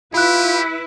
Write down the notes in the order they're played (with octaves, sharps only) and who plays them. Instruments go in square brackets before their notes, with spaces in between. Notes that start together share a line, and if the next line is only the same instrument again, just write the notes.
[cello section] E4 B4 [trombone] F4 [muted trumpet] G4 [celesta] B5 F#6